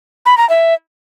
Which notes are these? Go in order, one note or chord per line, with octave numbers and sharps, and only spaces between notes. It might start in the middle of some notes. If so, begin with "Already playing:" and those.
B5
A#5
E5